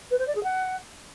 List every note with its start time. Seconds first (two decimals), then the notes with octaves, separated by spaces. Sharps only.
0.11 B4
0.19 C5
0.27 D5
0.35 G#4
0.43 F#5